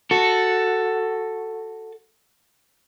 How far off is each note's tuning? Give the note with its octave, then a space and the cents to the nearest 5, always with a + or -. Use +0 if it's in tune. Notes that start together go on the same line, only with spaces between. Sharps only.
F#4 +0 A4 +5